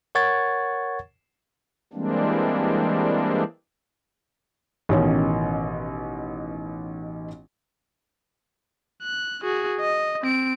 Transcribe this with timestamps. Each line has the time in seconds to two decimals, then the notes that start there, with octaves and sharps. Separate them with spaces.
0.15 A#4 C#5 F#5 C#6 G#6 A6
1.93 E3 G3 G#3 A#3 C4 D4
4.89 A1 B2 D#3 C#4 C#5 D#5
9.03 F#6
9.43 F#4 G#4
9.81 D#5
10.22 C4 D7